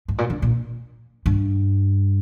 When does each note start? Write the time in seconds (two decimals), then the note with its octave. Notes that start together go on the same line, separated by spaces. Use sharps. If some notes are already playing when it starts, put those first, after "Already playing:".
0.08 G#2
0.18 A#2
0.30 D3
0.42 A#2
1.26 G2